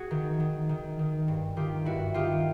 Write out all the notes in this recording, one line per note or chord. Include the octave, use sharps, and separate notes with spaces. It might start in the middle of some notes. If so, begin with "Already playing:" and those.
Already playing: F#4 G#4
D#3
D#3
D#3
D#3
G2
D#3 F4 G4
G2 E4 F#4
D#3 F4 G4